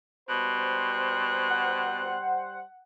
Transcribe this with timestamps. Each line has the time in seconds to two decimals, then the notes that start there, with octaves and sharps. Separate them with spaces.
0.29 B2 G3 C5 F#6
1.50 F#5